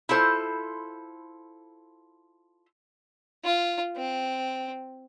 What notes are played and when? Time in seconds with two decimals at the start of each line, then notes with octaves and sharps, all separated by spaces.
0.09 E4 F4 A4 C5
3.44 F4
3.97 C4